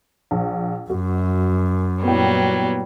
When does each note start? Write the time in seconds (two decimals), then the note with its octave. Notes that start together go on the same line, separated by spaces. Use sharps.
0.31 A#1
0.90 F#2 F#4
2.03 A#2 F#3 G3 B3 E4 G5